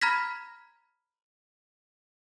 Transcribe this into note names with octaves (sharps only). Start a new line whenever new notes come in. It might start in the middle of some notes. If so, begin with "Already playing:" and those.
A#5 B5 F6 G#6 A#6 B6